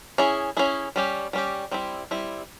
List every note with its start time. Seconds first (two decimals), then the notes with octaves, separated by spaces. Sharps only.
0.18 C#4 E4 G#4
0.57 C#4 E4 G#4
0.96 G3 C#4 G4
1.33 G3 C#4 G4
1.71 G3 C4 E4
2.11 G3 C4 E4